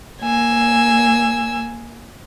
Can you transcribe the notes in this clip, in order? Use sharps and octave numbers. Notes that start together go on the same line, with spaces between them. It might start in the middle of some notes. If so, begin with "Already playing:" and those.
A#3 G#5 E6